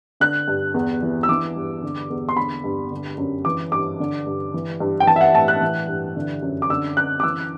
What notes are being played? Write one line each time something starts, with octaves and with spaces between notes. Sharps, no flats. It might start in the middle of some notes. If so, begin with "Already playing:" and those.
D3 F#6
G2
E2
E3
E6
E3 D6
G2
D3
E2
C6
D3 B5
G2
D3
F#2
E3 D6
G2 D6
D3
G2
E3
G2
G5
E3 A5
E5
F#5
A2 A5
F#6
E3
G2
D3
F#2
D6
D3 E6
F#2 F#6
D6
E3 E6